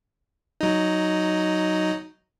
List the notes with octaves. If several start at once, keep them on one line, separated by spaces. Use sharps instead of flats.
F#3 D#4